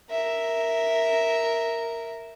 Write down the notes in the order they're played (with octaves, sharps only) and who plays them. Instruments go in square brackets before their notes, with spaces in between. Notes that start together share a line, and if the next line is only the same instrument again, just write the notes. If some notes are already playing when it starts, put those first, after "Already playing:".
[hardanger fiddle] A#4 E5